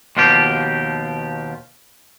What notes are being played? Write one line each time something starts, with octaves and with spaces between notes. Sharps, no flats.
D#2 B2 F3 F4 G4